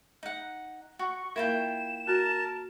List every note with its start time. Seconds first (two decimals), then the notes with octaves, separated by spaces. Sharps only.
0.23 D#4 F#5
0.99 F#4 C#6
1.36 A#3 E4 F4 A#4 G5 E7
2.07 F#4 A#4 A5